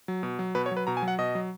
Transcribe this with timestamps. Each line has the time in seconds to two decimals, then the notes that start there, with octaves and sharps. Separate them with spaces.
0.08 F#3
0.23 B2
0.39 F#3
0.55 B2 B4
0.66 C#5
0.71 F#3
0.77 B4
0.87 B2 A#5
0.97 G#5
1.02 F#3
1.08 F#5
1.19 B2 D#5
1.35 F#3